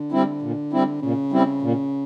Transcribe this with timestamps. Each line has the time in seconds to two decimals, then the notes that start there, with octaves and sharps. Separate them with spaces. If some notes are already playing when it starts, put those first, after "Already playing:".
Already playing: D3
0.12 G3 C4 E4
0.42 A#2
0.72 G3 C4 E4
1.02 A#2 C#3
1.32 G3 C4 E4
1.62 A#2